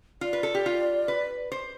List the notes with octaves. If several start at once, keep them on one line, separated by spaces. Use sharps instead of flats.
F4 D5
B4
A4
G4
F4
B4
C5